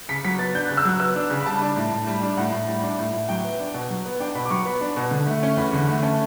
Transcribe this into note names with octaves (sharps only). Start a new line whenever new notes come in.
C#3 B6
F#3 B6
B3 A6
D4 G6
C#3 F#6
E6
F#3 F#6
B3 E6
D4
C#3
B5
G3 A5
D4
A2
A2
G3
D4
A2 F#5
A2
G3
D4
A2
A2
F#3 G5
B3
D4
B2
F#3
B3
D4 G5
B2 B5
D6
F#3 C#6
B3 B5
D4
B2
D3
A3
C#4
E2 B5
D3
A3
C#4 A5